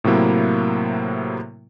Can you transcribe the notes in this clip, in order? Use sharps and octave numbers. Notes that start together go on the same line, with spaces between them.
A2 C3 F#3 A#3 E4